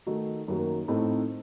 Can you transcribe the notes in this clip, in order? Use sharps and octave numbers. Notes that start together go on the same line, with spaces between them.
D#3 A3 D#4 F#4
F#2 D#3 F#3 A#3
A2 A3 C4 D#4